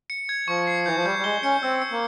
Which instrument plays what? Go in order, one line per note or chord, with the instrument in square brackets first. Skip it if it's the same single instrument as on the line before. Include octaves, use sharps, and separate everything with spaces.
[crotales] C#7
G#6
[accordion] F3 [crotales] C#6
[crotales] C7
[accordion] E3 [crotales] G6
[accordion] F3
[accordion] G3 [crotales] G6
[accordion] G3
[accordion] G#3 [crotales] G7
[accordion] C#4 [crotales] C#7
[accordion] C4 [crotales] E6
[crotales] C#7
[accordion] A#3